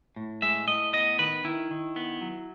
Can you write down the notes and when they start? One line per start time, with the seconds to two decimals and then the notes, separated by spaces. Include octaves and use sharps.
0.16 A2
0.42 G#3 E5
0.68 A2 D#5
0.93 B3 D#5
1.19 D#3 B4
1.44 D#3 E4
1.71 D#3
1.96 B3
2.21 F#3